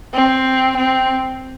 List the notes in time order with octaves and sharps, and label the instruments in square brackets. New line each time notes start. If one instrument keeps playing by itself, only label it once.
[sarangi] C4
C4